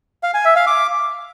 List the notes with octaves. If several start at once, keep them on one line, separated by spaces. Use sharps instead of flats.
F5
G#5
E5
F5
D6